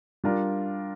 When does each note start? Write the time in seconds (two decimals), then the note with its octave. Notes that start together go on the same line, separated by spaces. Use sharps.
0.24 G3 D4 F4 A#4